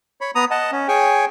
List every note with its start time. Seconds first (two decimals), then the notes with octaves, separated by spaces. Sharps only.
0.21 C#5 B5
0.35 B3 A#5 D#6
0.51 D#5 F#5 A5
0.72 C#4
0.88 G#4 C#5 G5 G#5